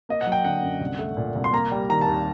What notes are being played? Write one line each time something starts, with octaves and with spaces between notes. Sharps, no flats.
A#3 D#5
F#5
F#3
G5
D3 F#5
F#2
C2
A3
A#2
C2
C6
A#3 A#5
G3
D#3 A#5
A5
D#2